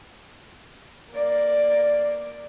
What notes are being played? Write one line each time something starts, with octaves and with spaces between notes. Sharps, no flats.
A#3 D5